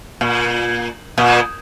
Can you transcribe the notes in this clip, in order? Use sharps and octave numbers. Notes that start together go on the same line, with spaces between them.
A#2
A#2